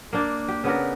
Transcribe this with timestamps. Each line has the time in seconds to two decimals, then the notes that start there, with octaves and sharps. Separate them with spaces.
0.13 A#3 D4
0.48 G4
0.64 C#3 B3 D4 A#4